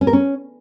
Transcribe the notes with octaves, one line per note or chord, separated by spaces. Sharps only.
C#4
A#4
C#4